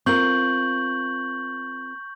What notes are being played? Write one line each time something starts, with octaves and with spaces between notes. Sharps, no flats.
C4 F4 A#4 C#6 G6 F#7